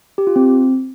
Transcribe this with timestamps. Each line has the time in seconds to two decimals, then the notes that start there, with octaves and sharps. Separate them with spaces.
0.18 G4
0.27 F4
0.36 C4